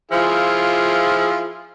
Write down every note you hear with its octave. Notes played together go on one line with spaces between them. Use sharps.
F3 E4 F4 G#4